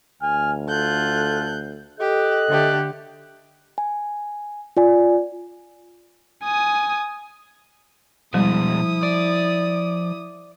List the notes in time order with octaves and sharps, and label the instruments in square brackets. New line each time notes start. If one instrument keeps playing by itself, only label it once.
[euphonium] D2 [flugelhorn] G#5 [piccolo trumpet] F6
[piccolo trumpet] F4 [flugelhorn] A4 [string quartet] F#6 G6
[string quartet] G4 [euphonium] A4 [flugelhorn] D#5 [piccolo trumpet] F#6
[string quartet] D3 A3 G4
[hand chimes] G#5
F4 D5 G#5
[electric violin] G#5 D#6
[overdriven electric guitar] B2 G#3 [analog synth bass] F3 [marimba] G3 [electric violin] E4 D#6
[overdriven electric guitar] D5